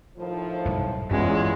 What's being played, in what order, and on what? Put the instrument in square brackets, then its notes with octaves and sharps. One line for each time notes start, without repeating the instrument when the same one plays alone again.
[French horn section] A2 D#3 F3
[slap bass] B1 G2
[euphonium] E2 [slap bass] G2 C#4 [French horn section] F#3 F4 [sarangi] G#3